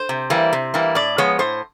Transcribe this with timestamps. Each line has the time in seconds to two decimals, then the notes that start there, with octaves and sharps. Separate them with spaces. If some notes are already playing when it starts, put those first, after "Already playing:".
Already playing: C5
0.09 C3
0.30 E3 G3 A#3
0.53 C3
0.74 E3 G3 A#3
0.95 A2 D5
1.18 F3 G#3 B3 C#5
1.39 A2 C5